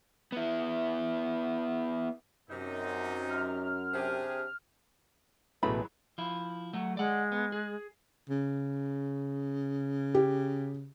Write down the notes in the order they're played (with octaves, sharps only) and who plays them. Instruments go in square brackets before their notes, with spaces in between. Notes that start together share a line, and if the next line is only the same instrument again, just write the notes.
[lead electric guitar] B3 E4
[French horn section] F#2 [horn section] C3 D#4
[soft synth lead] F6
[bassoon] C3 [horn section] D4 G4 G#4
[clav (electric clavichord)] A1 B2 A3 [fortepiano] E3 F#3 G#3 [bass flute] B4 [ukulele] B5
[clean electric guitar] F3 E4
[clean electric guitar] F#3 A3 [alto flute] F#5
[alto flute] G#3 [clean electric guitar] D5 F#5
[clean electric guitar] B3
G#4
[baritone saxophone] C#3
[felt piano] G4